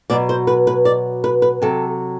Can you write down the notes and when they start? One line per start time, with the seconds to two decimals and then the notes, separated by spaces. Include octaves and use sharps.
0.10 B2 F#3 D5
0.29 C5
0.47 B4
0.67 B4
0.85 D5
1.24 B4
1.42 B4
1.62 C3 F#3 A4